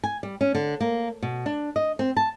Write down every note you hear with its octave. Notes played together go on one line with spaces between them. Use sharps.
G#5
G3
C#4
D3
A#3
B2
D4
D#5
C4
A5